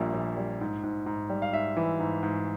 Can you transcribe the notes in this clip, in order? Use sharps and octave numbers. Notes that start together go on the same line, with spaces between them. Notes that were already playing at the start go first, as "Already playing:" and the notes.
Already playing: A#1 A#2 G3 A#3 E5
A#1
G3
G#2
G#2
G#2
G3
F5
G#2 E5
E3
G#2
G#2